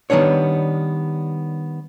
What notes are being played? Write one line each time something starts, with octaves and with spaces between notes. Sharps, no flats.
D#3 G3 B3 D4 C#5